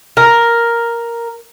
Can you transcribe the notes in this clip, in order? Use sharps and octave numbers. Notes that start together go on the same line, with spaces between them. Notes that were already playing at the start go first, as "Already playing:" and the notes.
A#4